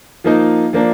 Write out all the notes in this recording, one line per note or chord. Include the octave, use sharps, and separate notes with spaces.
F3 A#3 D#4
F3 A#3 D4